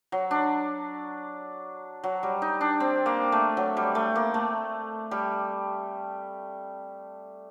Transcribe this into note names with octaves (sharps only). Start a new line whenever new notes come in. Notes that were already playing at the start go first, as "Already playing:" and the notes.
F#3
D4
F#3
G3
D#4
D4
C4
A#3
A3
F#3
G3
A3
A#3
A3
G3